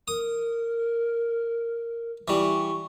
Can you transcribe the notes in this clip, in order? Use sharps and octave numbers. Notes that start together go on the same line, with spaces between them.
A#4 D#6
E3 G3 C#6